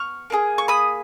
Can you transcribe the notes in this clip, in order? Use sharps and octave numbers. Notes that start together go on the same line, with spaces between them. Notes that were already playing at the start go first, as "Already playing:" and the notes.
Already playing: B3 C#6 F6
A#3 D#4 G#4
C#6
B5 D#6